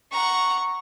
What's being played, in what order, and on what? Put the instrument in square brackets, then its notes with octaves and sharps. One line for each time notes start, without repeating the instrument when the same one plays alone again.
[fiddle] F#5 A#5 [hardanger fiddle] C#6